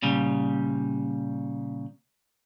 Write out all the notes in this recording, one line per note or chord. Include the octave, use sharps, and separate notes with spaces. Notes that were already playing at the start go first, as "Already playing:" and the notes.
A#2 C#3 G3